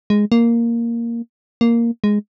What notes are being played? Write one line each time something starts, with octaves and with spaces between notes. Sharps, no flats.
G#3
A#3
A#3
G#3